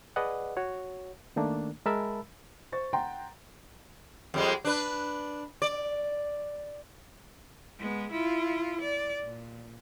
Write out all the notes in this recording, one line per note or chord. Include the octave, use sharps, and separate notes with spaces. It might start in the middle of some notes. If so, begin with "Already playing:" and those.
G#4 B4 D5 D#5 F#5
F#4 C#5
D#3 A3 A#3 D4
G#3 A#4 E5 A5 B5 E6
C5 C#6 A6
F#5 G5 A#5 C6
F2 G3 G#3
D4 B4
D5
G#3 B3
E4 F4
D5
A#2